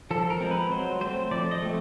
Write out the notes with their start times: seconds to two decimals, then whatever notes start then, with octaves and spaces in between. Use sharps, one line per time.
0.11 F3 A4
0.30 A#4
0.40 G#3 C4
0.51 B4
0.71 F#3 C5
1.01 A3 C4 C5
1.31 F3 D5
1.51 D#5
1.62 A3 C4